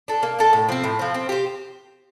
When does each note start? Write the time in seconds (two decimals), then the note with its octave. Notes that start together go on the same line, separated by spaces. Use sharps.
0.08 D4 A4
0.23 A#3
0.39 D4 A4
0.53 A2
0.69 F3 C4
0.84 A2
0.99 F3 C4
1.14 C4
1.29 G4 C5